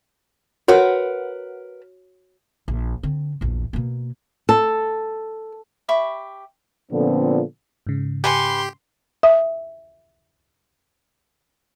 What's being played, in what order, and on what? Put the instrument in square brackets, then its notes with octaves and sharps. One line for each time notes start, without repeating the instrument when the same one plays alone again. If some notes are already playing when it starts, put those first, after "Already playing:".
[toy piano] F#4 C#5 [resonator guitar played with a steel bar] A#4 B4 F#5
[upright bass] A#1
D3 C4
A#1 E2
B2 A#3
[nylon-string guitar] A4
[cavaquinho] G4 E5 B5 C#6
[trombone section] A#2 D3 F3 B3 C4 A4
[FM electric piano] G#2 C#3
[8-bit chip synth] G4 [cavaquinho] B4 G#5 C#6 [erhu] C6
[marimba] E5 D#6